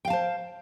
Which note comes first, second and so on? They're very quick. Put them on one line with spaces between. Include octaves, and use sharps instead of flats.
G5 F5 A5 C5